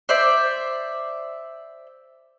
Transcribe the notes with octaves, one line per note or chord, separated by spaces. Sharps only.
C5 D5 E5